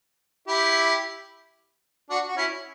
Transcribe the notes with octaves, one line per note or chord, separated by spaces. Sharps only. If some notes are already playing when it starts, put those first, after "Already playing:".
E4 G4
D4 F#4
F#4
C#4 E4